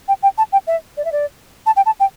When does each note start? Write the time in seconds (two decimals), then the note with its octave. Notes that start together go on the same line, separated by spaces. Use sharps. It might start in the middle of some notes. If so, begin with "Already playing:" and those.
0.08 G5
0.23 G5
0.38 A5
0.52 G5
0.67 E5
0.97 D5
1.05 E5
1.12 D5
1.66 A5
1.76 G5
1.86 A5
2.00 G5